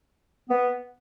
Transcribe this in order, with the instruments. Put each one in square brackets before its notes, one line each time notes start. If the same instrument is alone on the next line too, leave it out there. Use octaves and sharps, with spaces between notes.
[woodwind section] B3